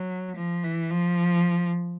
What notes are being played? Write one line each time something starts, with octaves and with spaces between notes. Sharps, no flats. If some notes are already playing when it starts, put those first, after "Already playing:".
Already playing: F#3
F3
E3
F3